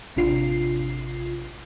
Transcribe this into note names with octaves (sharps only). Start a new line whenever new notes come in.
A1 C3 D4 F4 C7